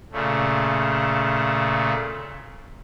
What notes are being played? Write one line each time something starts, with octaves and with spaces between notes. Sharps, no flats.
A#2 C#3 A3